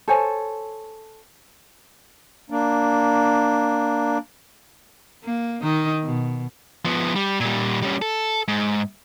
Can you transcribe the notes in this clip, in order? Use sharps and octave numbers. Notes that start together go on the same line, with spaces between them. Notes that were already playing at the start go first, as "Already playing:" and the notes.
A4 C5 C#5 G#5
A#3 D4
A#3
D#3 D#4
B2
F3 B3
G3
A#2 G3
G3 C#4
A4
G#2